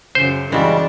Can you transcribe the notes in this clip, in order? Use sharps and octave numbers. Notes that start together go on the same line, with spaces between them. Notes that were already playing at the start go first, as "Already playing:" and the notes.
F#2 C#3 C5
C#3 E3 G3 G#3 D4 F#4